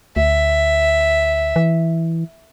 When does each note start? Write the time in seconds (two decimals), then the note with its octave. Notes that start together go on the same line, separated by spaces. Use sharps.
0.16 D2 E5
1.56 E3